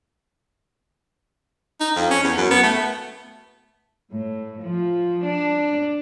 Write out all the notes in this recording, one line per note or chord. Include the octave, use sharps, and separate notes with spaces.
D#4
F2
C#4
E2
F#2
B3
A3
A2
F3
D4